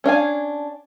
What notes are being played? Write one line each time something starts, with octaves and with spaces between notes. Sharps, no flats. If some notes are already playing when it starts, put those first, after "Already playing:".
C#4 D4 F5 G#5